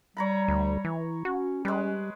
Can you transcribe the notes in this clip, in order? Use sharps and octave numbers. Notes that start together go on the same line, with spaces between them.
G3 C#5 A#5 B5
D2
E3
C#4 F#4
G3 G#3 B4